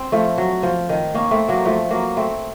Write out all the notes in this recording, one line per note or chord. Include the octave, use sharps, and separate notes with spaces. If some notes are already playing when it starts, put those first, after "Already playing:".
Already playing: C4
F3 A3
F#3
F3
D#3
A#3 C#4
A3 C4
F#3 A#3
F3 A3
F#3 A#3
A3 C4